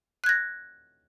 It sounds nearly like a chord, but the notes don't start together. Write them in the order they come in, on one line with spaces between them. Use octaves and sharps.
F#6 G#6 A#6